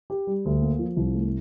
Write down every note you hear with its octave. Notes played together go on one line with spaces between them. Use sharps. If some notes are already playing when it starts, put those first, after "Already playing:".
G4
G3
D2
A#3
F3
C2
A3